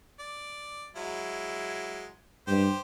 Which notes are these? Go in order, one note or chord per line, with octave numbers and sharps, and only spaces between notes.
D5
F#3 G#3 E4
G2 G4 C5